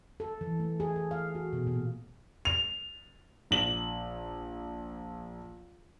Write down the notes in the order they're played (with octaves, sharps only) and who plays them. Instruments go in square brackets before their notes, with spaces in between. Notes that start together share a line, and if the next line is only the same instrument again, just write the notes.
[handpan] A4
E3
A3
G#4
A4
F5
F#4
B2
A#2
[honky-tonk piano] F7
[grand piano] A#1 F#7